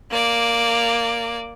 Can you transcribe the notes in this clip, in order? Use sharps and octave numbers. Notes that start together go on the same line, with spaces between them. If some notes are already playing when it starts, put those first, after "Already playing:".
A#3 D5